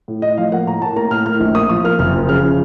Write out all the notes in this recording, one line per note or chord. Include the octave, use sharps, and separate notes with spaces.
A2
A2 D#5
F3 F5
A#3 F#5
A2 A#5
A2 A5
A#3 A#5
A2 F6
A2 F6
A#1
A#3 D#6
F3 D#6
A#3 F6
F#1 F6
F3
C#3 F6
F3